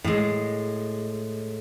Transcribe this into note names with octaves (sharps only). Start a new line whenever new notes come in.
A2 G#3